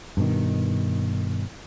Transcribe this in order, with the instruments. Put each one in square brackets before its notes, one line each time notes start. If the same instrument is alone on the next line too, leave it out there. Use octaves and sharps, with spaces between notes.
[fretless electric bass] G2 B2 D#3